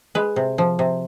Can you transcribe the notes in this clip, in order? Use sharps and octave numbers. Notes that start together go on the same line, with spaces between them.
G#3 B4
C3
F3
C3